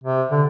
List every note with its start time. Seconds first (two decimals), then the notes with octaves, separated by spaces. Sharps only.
0.04 C3
0.32 D3